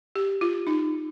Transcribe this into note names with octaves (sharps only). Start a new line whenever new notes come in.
G4
F4
D#4